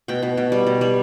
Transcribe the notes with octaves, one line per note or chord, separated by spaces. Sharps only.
B2 G5
B2
B2
G3
B2
G3